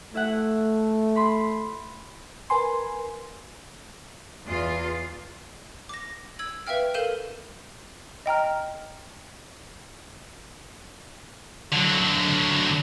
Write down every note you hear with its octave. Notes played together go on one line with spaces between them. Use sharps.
A3 E4 E5 F#5
B5 C6
A#4 B4 G#5 C6
E2 F4
D6 A#6
E6 G#6 F#7
B4 E5 F5 G5 F6
A4 A#4 F5 G6 D#7 E7
D#5 G5 A#5 F6
D3 F#3